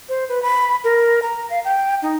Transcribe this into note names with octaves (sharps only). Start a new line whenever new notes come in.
C5
B4
B5
A#4
A#5
F5
G5
D#4